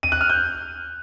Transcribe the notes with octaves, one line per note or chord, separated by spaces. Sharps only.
D#7
F#6
F6
G6